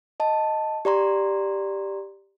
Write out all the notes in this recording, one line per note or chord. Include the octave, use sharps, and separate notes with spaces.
D#5 A5
G4 D5 A#5 C6